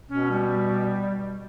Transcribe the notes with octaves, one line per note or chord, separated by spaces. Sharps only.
B2 C#4
G3